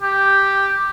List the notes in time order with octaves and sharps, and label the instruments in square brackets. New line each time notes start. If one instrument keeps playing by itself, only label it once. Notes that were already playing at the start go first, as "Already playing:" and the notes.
[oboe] G4